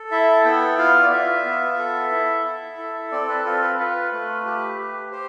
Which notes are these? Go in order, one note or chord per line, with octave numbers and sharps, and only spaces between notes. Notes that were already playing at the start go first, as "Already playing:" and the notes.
Already playing: A4
E4 E5
B3 G5
F4 F5
D5
F4 E5
B3
A4
E4
E4
A4
C4 D5
B4
F4 A4
B4
F4 B4
A3
G4
G4
G4 C5